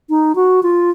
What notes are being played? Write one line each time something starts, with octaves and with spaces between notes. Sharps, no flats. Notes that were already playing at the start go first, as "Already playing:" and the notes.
D#4
F#4
F4